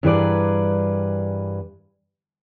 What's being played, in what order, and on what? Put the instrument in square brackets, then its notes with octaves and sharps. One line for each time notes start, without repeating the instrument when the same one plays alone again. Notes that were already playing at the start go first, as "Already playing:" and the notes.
[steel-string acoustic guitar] G2 E3 G#4 A#4 B4 D5